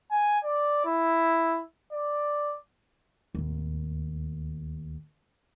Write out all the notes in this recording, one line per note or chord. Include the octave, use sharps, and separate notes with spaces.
G#5
D5
E4
D5
D1 D#2